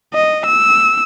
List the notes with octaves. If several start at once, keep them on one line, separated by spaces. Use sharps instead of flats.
D#5
E6